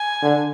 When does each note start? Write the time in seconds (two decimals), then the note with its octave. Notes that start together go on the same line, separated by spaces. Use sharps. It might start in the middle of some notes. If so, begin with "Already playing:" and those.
Already playing: G#5
0.22 D3